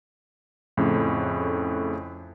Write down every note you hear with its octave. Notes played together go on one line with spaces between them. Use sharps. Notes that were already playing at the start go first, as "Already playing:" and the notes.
F2 A2 C#3